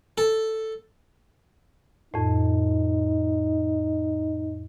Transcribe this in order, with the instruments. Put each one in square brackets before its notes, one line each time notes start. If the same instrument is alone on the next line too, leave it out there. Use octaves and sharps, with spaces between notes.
[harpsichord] A4
[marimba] F2 A2 [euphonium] D#4